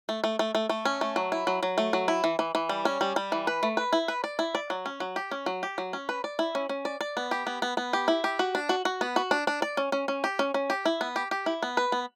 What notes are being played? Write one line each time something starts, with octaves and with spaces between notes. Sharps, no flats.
A3
A3
A3
A3
A3
C#4
A3
F#3
E4
F#3
F#3
A3
F#3
E4
E3
E3
E3
G3
C#4
G3
G3
E3
B4
A3
B4
E4
B4
D5
E4
D5
F#3
C#4
F#3
G4
C#4
F#3
G4
F#3
C#4
B4
D5
E4
C#4
C#4
D5
D5
B3
G4
B3
B3
B3
G4
E4
G4
F#4
D4
F#4
F#4
B3
F#4
D4
D4
D5
C#4
C#4
C#4
G4
C#4
C#4
G4
E4
B3
G4
G4
E4
B3
B4
B3